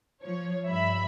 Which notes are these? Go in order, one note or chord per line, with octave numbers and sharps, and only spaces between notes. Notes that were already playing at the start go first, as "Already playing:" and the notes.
F3 C#5
G2 E5 B5